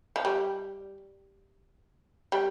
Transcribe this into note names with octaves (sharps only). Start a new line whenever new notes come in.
F3
G3
G3